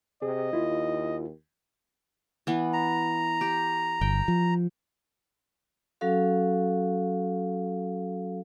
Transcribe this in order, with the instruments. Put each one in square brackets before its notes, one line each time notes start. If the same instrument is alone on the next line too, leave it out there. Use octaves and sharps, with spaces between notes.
[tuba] C3 [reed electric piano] G#4 [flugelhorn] D#5
[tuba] D#2 [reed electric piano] E4 F4
[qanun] E3 B3
[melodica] A#5
[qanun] G4
[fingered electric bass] G1 [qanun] G5
[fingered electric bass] F3
[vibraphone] F#3 C#4 F#4 A4 F5